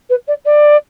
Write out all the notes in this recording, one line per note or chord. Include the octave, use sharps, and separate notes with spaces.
B4
D5
D5